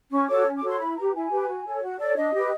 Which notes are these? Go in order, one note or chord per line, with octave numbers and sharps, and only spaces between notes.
C#4 C#6
F#4 A4 C#5 D6
C#4
D6
F#4 A4 C#5
C6
E4 B5
G4 B4 A#5
E4 G#5
G4 B4
F#4
A4 C#5
F#4
A4 C#5 D5
D4 D#5
G4 B4